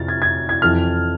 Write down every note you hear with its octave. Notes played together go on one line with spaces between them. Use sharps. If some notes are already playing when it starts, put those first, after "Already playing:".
Already playing: F2 C3 F3 F6 A6
G#6
G#6
G#6
F2 E3 F6